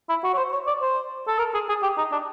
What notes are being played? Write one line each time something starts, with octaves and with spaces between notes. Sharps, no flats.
E4
F#4
C#5
C5
C#5
D5
C5
A4
A#4
G#4
G#4
G4
D#4
D4